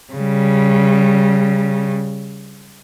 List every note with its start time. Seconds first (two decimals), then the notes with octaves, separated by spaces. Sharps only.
0.13 C#3 G3